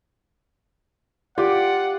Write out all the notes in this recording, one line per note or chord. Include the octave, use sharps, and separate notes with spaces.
F4 G4 D5 F#5